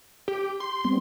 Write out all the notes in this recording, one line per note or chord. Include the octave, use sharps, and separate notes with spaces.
G4
C6
G3 B3 C4